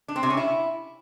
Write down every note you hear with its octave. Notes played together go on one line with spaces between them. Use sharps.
D4
C4
C3
C#4
E4